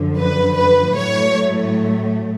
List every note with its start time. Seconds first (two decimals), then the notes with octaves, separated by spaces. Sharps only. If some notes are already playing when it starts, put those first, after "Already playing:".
Already playing: F#2 D3 F3
0.17 B4
0.56 B4
0.96 A2 F#3 A3 C#5